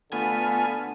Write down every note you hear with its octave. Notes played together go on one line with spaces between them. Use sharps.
D3 A3 B3 F4 G#5